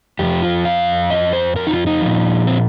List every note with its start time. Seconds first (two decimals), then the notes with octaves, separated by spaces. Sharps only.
0.19 F2 F3 G4
0.42 F4
0.65 F5
1.10 D#5
1.33 C5
1.56 A#4
1.67 D#4
1.71 F4
1.87 D#4
2.01 A#2 F3
2.47 C4